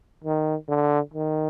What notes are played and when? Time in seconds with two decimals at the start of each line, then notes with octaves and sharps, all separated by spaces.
0.24 D#3
0.69 D3
1.14 D#3